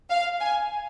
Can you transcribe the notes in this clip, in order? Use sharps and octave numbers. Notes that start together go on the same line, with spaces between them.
F5
G#5